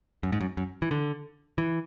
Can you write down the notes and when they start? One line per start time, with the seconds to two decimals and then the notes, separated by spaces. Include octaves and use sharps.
0.23 F#2
0.32 G#2
0.41 F#2
0.57 F#2
0.82 E3
0.91 D3
1.58 E3